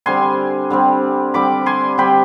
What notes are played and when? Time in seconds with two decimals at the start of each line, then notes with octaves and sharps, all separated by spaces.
0.06 D3 G3 C4 G#5 C6
0.70 D3 G3 C4
1.34 D3 G3 C4 B5 D6
1.66 G#5 C6
1.98 D3 G3 C4 G5 B5